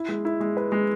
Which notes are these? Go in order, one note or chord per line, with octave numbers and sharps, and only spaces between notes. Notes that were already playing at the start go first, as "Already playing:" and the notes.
Already playing: E4
G#3
E4
G#3
B4
G#3